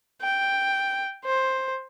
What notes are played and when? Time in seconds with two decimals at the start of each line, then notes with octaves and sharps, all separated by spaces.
0.22 G5
1.25 C5